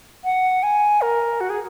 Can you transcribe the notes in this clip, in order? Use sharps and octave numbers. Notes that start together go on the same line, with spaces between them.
F#5
G#5
A#4
F#4
G#4